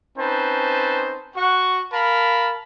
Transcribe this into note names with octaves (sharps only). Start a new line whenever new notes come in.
C4 C#4 D#4 B4 C5 A5
F#4 F#5 C#6
A#4 F5 A5 B5